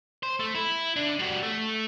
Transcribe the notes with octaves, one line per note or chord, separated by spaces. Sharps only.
C5
A3
E4
D3 D4
G3 F#4
A3